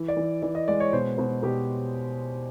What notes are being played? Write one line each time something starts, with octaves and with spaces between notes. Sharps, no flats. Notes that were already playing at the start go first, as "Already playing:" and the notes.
Already playing: E3
D5
E3
E3 D5
D#5
G#3 D5
C#5
B2 C5
B2 C5
B2 G4